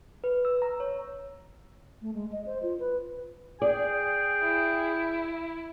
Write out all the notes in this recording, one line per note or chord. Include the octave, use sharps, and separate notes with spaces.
B4
E6
A#5
C#5
A3
G#3
D#5
C5
F4
B4
G#4 D5 G5
E4